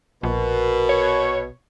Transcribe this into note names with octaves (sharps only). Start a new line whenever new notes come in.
A#1 B2 A#4
C#5